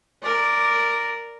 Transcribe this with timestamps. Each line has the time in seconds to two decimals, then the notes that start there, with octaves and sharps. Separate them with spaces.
0.22 A#4 D5